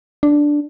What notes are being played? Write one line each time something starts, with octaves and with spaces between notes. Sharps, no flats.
D4